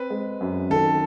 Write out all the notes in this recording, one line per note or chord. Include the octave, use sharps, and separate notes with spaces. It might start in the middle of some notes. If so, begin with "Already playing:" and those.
Already playing: C4 B4
G#3
F#2
D#3 A4